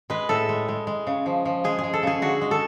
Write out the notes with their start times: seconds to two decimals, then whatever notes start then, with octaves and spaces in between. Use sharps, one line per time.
0.10 G#3 B4
0.29 A2 A4
0.49 G#3
0.68 G#3
0.87 G#3
1.07 C#3
1.26 F3
1.45 F3
1.64 G#3 G#4
1.79 G#3 G#4
1.93 A4
2.03 C#3 G#4
2.22 D3 F#4
2.41 G#3
2.51 A4